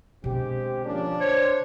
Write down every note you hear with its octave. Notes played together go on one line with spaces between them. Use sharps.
B2 D3 G#3 C4 G4
F3 A#3 C#4 D4
C5 C#5